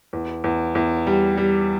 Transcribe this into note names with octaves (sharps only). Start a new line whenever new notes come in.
E2
E2
E2
G3
G3